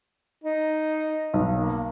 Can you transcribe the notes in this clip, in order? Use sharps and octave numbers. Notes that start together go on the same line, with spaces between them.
D#4
B1
A#3